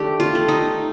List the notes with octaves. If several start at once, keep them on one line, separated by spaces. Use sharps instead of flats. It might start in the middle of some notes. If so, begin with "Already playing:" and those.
Already playing: D#3 A3 D4 G4
F4
A3
D#4